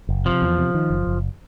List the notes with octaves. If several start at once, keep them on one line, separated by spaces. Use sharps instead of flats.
F#1
C3 F3
E2
C3
D#3
F#1
F#1